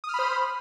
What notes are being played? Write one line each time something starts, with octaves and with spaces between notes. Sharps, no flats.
C5 B5 D#6 F6